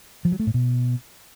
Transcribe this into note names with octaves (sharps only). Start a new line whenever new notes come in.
F3
F#3
A3
A2
B2